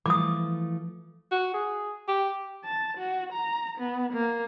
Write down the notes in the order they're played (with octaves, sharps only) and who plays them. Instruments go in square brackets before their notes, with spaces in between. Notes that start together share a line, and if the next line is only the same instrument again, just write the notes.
[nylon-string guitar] E3 F3 A3 [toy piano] D6 D#6
[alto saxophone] F#4
G#4
G4
[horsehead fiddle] A5
F#4
A#5
B3
A#3